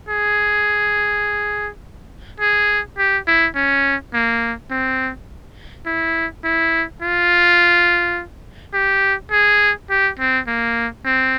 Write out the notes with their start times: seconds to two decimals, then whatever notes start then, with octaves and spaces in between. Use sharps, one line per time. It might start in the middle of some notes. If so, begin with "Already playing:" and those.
0.09 G#4
2.40 G#4
2.98 G4
3.27 E4
3.55 C#4
4.14 A#3
4.71 C4
5.86 E4
6.44 E4
7.02 F4
8.74 G4
9.31 G#4
9.90 G4
10.19 C4
10.47 A#3
11.05 C4